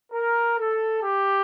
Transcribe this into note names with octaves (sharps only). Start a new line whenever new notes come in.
A#4
A4
G4